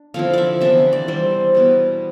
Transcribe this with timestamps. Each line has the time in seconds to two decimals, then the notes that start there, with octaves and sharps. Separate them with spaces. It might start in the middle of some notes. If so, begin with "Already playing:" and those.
Already playing: D4
0.14 D3 F3 C4 E4 F5
0.34 D5 E5
0.61 C3 E3 B3 D4 E5
0.93 D5
1.08 E3 G3 C4 C5
1.55 B2 B3 E4